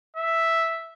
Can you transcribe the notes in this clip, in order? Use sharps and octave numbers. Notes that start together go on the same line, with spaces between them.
E5